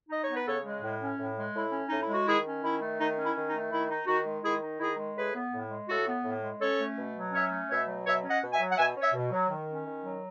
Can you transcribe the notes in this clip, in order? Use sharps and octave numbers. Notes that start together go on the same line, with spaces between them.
D#4 D#5
B3 C#5
B4
C#3 A4 C#5
G#3
A2
C#4
A2
G#3
A2 E4
C#4
A2 D#4
E4
G#3 F#4
D#3 E4 G#4
C#4
D#3 E4
A3
D#3 D#4
C#4
E4
D#3
D#4
A3
D#3 E4
D#4
D#3 D#4 F#4
G#3
D#3 E4 G#4
D#4
D#3 E4 G#4
G#3
A2 G#4 B4
B3
A2
G#3
A2 F#4 A4
B3
A2
G#3
C#4 A4 C#5
A3
B2
F#3
C#4 C#5 E5
A3
B2 C#5 E5
F#3
B2 C#5 E5
C#4
D#5 F#5
B2
E5 G#5
F#3
F#5
B2 E5 G#5
C#4
C#5 E5
B2
F#3
D#3
C#4
D#3
F#3